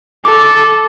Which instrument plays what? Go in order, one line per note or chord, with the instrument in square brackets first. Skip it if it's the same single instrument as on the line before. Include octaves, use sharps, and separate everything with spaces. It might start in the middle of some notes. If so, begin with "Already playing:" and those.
[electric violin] A4 [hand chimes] D6